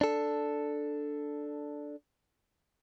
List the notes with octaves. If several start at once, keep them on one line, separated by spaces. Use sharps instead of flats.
D4 A4